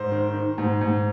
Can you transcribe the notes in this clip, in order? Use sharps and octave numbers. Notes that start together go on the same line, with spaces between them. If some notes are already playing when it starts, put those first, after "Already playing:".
Already playing: G#2 C5
D#3
D#3
G#2
G#2